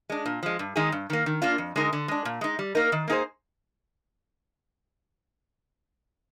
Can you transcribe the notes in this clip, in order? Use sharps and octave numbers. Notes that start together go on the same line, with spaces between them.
G#3 D4
A#2
F3 G#3
G2
D#3 G#3 D#4 G#4
G2
D#3 A#3
D#3
A#3 D4 F4
F2
D3 G#3 D#4 A#4
D3
G#3 D4
A#2
G#3 D#4
G3
A#3 D#4 A#4
D#3
A#3 D#4 G#4 C5